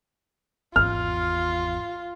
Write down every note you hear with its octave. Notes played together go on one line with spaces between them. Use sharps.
G#1 E2 F4 F6